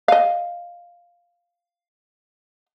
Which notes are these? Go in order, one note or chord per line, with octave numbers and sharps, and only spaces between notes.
D#5 F5